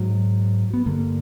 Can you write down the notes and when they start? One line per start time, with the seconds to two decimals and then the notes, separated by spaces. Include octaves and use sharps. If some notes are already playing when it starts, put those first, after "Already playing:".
Already playing: G#2 F#3
0.73 B3
0.86 G2 D3 A#3